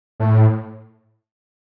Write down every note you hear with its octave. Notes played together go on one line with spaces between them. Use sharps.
A2